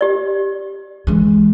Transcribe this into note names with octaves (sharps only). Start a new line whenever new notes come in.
G4 D5
E3 G#3